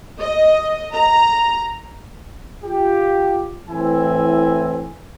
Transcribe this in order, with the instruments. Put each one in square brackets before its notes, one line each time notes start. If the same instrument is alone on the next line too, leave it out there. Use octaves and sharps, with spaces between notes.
[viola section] D#5
A#5
[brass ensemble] F4 G4
A2 E3 C4 E4 G#5